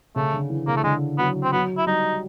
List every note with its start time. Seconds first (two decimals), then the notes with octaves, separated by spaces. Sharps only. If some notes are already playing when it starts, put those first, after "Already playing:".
0.16 C#3 A3
0.33 D3
0.50 E3
0.67 C#3 A#3
0.76 A3
0.84 D3 G#3
1.18 F#3 B3
1.43 C4
1.53 F#3 B3
1.78 E4
1.86 G3 D#4